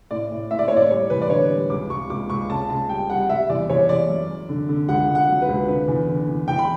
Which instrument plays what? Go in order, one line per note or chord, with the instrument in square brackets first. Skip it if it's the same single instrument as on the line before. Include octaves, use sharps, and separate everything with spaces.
[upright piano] A2 D5
A2
A2 E5
D5
A2 C#5
D5
G3 C#5
E2 B4
D5
D3 C#5
G3
C#2 D6
C#2 C#6
C#2 D6
C#2 C#6
C#3 A5
C#3 A5
G3 G5
G3 F#5
G3 E5
E2 D5
E2 C#5
E2 D5
F#2
F#2
D3
D3
C#2 F#5
C#2
F#5
F#3
B4
C#2
D3 B4
E2
D3
E2
E2 G5
B5